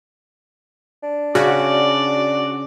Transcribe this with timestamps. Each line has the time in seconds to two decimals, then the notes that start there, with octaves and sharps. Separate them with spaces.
1.03 D4
1.35 C#3 F#4 D5